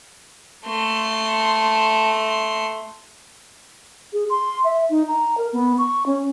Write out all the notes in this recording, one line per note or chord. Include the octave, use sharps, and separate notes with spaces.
A3 C6
G#4
C6
E5
D#4
A#5
A#4
B3
C#6
C#4